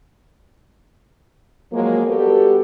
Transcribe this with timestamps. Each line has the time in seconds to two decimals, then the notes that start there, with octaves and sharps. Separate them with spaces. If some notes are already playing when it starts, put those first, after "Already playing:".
1.72 F3 F#3 G#3 A#3
2.07 G3 B3 F#4 G4 A4